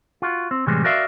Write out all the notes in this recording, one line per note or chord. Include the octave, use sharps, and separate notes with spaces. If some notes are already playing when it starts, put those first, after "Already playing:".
F4 F#4
C4
A2 C3 E3 G3 G#3
F#4 A#4 D5 E5 F5